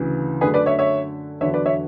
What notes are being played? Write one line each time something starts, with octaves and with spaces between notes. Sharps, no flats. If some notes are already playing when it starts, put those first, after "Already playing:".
Already playing: D2 C#3 E3
F#2 D3 A3 G#4 B4
B4 D5
C#5 E5
C#5 E5
E2 D3 F#3 C#5 E5
B4 D5
C#5 E5